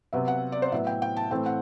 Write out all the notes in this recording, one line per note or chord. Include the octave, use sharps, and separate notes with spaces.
C3 F#3 B3 E5
F#5
D5
C5
A2 F#3 B3 E5
G5
G5
A5
A2 E3 A3 C4 G5
F#5